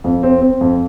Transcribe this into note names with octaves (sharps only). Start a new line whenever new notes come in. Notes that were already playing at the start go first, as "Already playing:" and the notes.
F2
C4
C4
F2